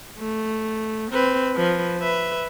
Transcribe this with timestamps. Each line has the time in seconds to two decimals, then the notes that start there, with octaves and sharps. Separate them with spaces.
0.20 A3
1.12 C4 B4
1.56 F3 B4
1.99 B4 E5